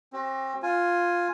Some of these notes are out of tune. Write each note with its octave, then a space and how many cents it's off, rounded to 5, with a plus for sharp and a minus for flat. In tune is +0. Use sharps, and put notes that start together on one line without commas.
C4 +35 F#4 +40
F4 +5 G#5 +0